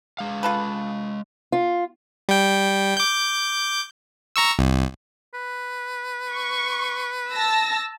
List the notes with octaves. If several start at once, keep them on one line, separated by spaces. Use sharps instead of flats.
G#3 F5
F4 A4 B4
F4
G3 G5
D6 G6
A#5 C#6 E6
C2
B4
C#6
A5 E6 A#6